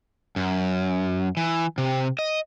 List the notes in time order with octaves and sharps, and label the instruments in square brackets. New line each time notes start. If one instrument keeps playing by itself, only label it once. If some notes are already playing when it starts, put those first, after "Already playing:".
[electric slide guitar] F#2
E3
C3
D#5